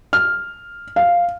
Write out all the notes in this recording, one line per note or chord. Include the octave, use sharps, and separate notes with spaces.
F6
F5